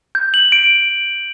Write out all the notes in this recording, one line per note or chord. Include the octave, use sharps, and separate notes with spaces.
G6
F#7
D7